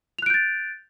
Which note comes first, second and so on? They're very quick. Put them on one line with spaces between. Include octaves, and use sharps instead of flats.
F7 F#6 D7 G6 A6